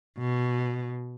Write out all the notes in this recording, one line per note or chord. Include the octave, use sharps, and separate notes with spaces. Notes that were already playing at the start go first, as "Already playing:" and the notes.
B2